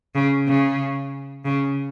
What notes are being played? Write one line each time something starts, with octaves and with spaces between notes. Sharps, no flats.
C#3
C#3
C#3